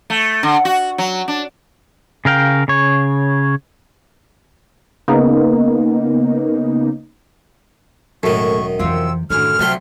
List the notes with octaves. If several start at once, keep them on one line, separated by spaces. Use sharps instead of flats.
A3
D3
F#4
F#3
D4
C#3 A#4 F5 G5
C#3 C#5
C#3 A#3 B3 D#4
E1 F#2 A2 D#3 A4 C#6
F2 C3 E3 F4 E6
F#2 A2 D3 D#3 F6
D2 C3 F3 F#3 A3 C4 C6